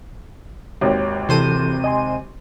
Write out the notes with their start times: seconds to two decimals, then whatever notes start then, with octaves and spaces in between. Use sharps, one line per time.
0.81 G#1 D#2 C#5
1.29 C3 E3 A4 C5 D#7
1.84 D#5 G#5 C6